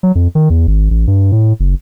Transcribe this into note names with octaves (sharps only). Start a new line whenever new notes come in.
F#3
F2
D#3
E2
G#1
A1
G2
A2
F#1